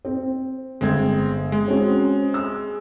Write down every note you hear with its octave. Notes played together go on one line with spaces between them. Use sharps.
C4
G1 G#3 C4 G#6
G#3
C4 C#4 F#4
E6